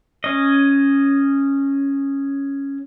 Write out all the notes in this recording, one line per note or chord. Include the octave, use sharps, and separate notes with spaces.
C#4 D#5